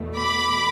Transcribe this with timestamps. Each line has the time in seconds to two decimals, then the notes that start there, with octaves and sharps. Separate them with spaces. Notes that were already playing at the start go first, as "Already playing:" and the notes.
Already playing: E2 B2 A3
0.17 B5 D6